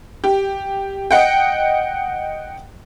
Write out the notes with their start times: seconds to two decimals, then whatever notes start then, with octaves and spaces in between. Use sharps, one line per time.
0.24 G4
1.11 D#5 F#5 G5